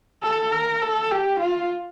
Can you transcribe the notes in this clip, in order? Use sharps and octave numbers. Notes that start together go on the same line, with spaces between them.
A4
A#4
A4
G4
F4